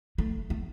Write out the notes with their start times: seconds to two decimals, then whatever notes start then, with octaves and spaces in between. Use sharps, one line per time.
0.18 A3
0.50 A3